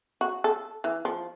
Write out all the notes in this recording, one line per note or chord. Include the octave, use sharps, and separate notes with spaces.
F#4
A4
E3
F3